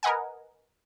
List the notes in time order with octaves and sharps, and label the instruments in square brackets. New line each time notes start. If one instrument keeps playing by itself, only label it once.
[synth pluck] A#4 B4 D#5 F#5 G#5